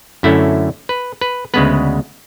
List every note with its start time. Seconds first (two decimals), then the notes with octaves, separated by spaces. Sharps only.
0.23 F#2 D3 A3 C#4 E4
0.89 B4
1.21 B4
1.54 D2 C#3 G#3 B3 B4